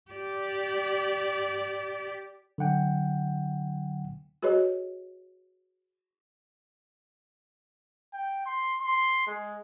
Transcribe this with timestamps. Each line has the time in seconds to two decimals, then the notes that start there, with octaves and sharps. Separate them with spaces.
0.11 G4 D5
2.58 D3 F#3 F#5 G5
4.42 F#4 G#4 B4 C#5 D#5
8.13 G5
8.46 C6
8.81 C6
9.27 G#3